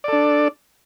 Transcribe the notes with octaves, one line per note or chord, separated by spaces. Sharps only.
D4 A4 D5